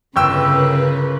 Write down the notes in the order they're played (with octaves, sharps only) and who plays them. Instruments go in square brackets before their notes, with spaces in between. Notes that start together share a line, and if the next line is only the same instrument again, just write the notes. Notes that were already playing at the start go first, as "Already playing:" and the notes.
[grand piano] G1 G5 E6 [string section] C#3 A#4 B4